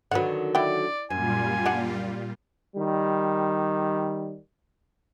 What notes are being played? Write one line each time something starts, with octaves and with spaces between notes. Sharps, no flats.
D3 D#3 F#3 B4 F#5
E4 D5 F#5 G5
F#2 A#2 G3 F4 G#5
D4 F#5
D#3 G3